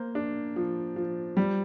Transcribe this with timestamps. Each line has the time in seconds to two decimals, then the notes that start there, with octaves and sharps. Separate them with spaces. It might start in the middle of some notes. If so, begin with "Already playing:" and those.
Already playing: A#3 C5
0.15 D4
0.56 F3
0.96 F3
1.37 G3